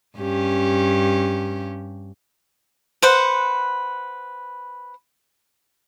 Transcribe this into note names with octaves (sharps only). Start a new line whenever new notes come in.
G2 C#4 G4
B4 C5 F#5